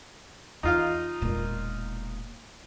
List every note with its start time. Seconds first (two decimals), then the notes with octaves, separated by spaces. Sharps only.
0.63 E2 D#4 F4 F5
1.22 E1 A#2